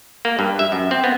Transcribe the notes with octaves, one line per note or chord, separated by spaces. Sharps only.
A#3
G2
E5
F#2
C4
B3